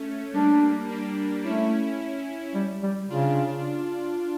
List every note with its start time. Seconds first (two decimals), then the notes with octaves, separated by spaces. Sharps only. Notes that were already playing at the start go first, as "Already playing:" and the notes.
Already playing: A3 C#4
0.33 G3 A#3 D4
0.88 A#3 D4
1.44 A3 C#4 E4
2.54 G3
2.83 G3
3.10 C#3 D4 F4